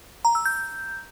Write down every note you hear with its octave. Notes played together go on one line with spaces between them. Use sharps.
A#5
E6
G6